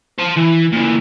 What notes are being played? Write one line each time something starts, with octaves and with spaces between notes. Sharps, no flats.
C5 A5
E3
A#2 E3